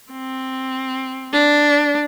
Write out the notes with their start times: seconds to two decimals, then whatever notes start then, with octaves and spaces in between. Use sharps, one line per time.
0.12 C4
1.33 D4